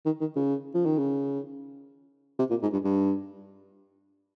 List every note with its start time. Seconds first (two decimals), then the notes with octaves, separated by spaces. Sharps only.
0.05 D#3
0.21 D#3
0.36 C#3
0.74 F3
0.86 D#3
0.98 C#3
2.39 C3
2.50 A#2
2.62 G#2
2.73 G2
2.85 G2